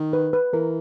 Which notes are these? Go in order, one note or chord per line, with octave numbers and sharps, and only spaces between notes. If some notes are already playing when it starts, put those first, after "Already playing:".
Already playing: D#3
B4
B4
E3 A#4